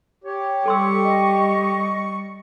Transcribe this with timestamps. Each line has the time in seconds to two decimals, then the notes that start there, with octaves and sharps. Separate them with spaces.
0.24 G4 C#5
0.66 G3 A4 C6 C#6 E6
1.04 D#5